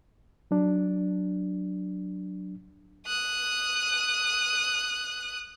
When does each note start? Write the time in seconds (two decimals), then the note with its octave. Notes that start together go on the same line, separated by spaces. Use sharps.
0.51 F#3 D4
3.07 D#6 F#6